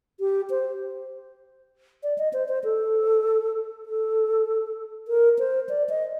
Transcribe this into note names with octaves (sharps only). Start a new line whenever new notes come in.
G4
C5
D5
D#5
C5
C5
A4
A4
A#4
C5
D5
D#5